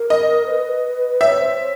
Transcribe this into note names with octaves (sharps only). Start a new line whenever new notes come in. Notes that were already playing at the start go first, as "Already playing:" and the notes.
Already playing: A#4
D#5
C5
B4
C#5 E5
C5
C#5